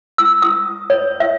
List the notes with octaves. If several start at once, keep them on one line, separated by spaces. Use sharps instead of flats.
E6
D#6
C#5
E5